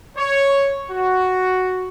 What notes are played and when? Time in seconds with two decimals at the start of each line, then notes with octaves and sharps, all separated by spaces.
0.17 C#5
0.90 F#4